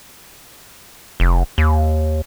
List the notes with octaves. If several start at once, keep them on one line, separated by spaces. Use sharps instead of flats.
F1
D#2